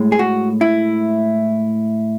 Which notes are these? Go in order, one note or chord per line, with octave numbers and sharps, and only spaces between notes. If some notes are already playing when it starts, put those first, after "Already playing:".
Already playing: A2 G#3
G#4
F#4
E4